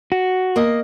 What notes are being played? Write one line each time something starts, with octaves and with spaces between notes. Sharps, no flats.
F#4
A#3 D#5